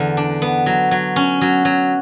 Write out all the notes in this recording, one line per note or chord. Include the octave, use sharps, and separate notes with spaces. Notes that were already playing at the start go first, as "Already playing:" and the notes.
Already playing: E2 D3
D4
B3
F#3
F#3
C#4
F#3
F#3